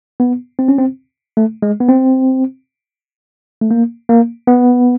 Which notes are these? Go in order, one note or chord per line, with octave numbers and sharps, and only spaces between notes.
B3
C4
C#4
C4
A3
G#3
B3
C4
A3
A#3
A#3
B3